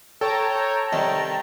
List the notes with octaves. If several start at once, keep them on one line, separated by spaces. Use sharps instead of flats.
A4 C#5 G5 A5 A#5
C2 D#3